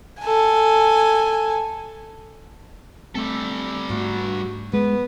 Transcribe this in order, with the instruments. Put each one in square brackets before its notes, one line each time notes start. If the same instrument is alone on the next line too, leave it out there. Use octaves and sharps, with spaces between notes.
[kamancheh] A4 G#5
[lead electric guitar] G3 A4 [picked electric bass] A3 C4
[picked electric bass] G#2 A3 [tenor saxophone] F#4
[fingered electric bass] G#3 [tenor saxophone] B3